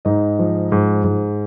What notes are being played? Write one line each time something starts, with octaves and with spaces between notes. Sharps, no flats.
G#2 D#4 D#5
F3
G#2
G#2